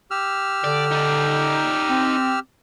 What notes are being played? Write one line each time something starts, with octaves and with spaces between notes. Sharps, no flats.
G4 E6 F6
D3 D5
D#4 D5
C4